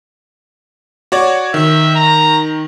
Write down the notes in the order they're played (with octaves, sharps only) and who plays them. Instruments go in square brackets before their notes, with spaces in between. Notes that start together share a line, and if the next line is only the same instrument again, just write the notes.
[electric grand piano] F#4 C#5 D5
[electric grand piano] D#3 [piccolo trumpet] E5
[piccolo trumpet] A#5